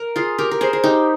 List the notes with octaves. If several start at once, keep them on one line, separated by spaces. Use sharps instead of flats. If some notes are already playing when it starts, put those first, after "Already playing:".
Already playing: A#4
F4 G#4
G4 A#4
A#4
G#4 C5
G#4
D#4 G4